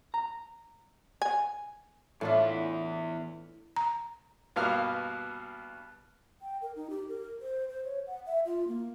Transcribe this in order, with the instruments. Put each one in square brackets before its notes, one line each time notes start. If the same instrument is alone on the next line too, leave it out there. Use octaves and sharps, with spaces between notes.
[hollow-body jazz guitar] A#5
[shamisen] G#5
[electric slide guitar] E2 E4 [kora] A2 D4 F4
[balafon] A#5
[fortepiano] G2 B2 A#3 B3 F5 F6
[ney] G5
A#4
D#4
G4
A#4
C5
C5
C#5
F#5
E5
F4
A#3